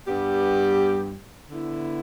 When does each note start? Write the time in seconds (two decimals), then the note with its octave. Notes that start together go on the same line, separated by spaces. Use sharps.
0.07 G2 G3 B3 G4
1.49 D3 B3 E4